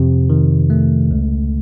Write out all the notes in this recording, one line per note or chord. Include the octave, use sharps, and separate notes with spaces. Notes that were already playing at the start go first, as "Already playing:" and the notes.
Already playing: F2 C3
D#3
A3
C#2